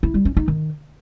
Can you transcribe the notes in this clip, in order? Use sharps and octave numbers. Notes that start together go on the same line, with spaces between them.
E4
G3
C#4
D#4
D#3